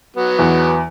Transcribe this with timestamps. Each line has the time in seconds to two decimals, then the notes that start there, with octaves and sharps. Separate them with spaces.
0.17 F#3 B3
0.39 E2